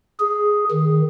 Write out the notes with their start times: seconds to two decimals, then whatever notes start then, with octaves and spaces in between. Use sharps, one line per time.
0.20 G#4
0.71 D#3